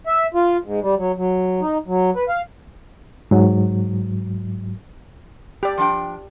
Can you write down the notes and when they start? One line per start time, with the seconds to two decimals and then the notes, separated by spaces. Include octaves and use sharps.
0.07 E5
0.34 F4
0.64 G#2
0.82 G3
0.97 F#3
1.17 F#3
1.61 D#4
1.87 F#3
2.16 B4
2.29 F5
3.31 G#2 F#3
5.63 G4 D5
5.77 F3 D4 G5